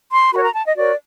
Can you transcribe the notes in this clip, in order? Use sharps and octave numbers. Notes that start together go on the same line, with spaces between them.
C6
F#4 A#4 C#5 B5
A#5
A5
D#5
F#4 A#4 C#5 D5